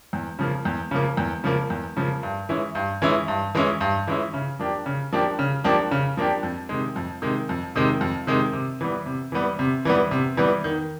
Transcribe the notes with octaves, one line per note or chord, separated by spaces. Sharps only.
E2
C#3 F3 A#3
E2
C#3 F3 A#3
E2
C#3 F3 A#3
E2
C#3 F3 A#3
G2
E3 G#3 C#4 E4
G2
E3 G#3 C#4 E4
G2
E3 G#3 C#4 E4
G2
E3 G#3 C#4 E4
C#3
F3 A#3 D4 G4
C#3
F3 A#3 D4 G4
C#3
F3 A#3 D4 G4
C#3
F3 A#3 D4 G4
F2
C3 D#3 G#3
F2
C3 D#3 G#3
F2
C3 D#3 G#3
F2
C3 D#3 G#3
C3
E3 G3 B3
C3
E3 G3 B3
C3
E3 G3 B3
C3
E3 G3 B3
D#3